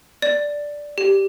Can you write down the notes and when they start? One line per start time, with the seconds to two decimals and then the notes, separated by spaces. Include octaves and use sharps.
0.22 D5
0.98 G4